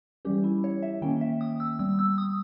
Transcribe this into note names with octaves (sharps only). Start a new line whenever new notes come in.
E3 G3 C#4 G4
E4
C#5
E5
D#3 A#3 C#4 G5
E5
D#6
E6
G3 B3 E6
E6
D#6